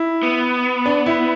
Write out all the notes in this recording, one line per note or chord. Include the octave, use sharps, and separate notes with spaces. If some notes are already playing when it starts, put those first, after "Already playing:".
Already playing: E4
B3
D4
E4